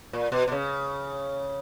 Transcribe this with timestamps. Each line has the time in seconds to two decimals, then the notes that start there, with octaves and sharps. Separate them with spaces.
0.13 A#2
0.32 B2
0.48 B2
0.52 C#3